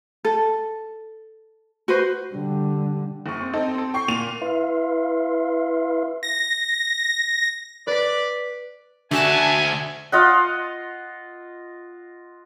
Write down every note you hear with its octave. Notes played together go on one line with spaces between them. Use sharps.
A4
F#4 B4 C5
D3 G3
F#1 C#6
C4
C4 D#4 A4
C4 A4
G5 C#6 C7
A#2 D#7 F7
E4 B4 E5 F5 C6
A#6
B4 D5 B6
D2 D3 F#4 E5 G#5 A5 F#6
F4 D#5 F#5